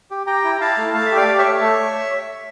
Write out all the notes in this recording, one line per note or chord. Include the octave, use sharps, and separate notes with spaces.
G4
G4 G5 A#5
E4
A#5
E4 F5 A5
A3
A3 F5 A5
E5
G4
D5 F5
G4
C#5 E5
A3
A3